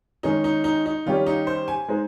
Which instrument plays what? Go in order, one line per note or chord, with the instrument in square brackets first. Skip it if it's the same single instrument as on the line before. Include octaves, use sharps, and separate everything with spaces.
[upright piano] D#3 G#3 C#4 G#4 [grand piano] D#4
[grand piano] D#4
D#4
D#4
[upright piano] D#3 G3 C#4 G4 C#5 [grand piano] F4
[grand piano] D#4
C5
G#5
[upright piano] G#3 D#4 G#4 C5